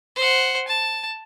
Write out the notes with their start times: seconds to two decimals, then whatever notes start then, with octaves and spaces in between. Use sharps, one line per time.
0.16 C5 F#5
0.68 A5